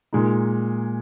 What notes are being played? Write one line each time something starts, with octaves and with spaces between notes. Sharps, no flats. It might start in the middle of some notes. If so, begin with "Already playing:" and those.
A#2 G#3 D#4